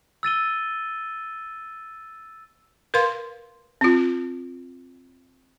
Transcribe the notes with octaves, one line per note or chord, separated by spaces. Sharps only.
E6 A6 D#7 G7
A#4 B4 F5 C6
C4 F4